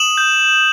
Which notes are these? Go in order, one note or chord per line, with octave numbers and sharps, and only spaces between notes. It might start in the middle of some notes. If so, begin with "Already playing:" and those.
Already playing: D#6 E7 F#7
G6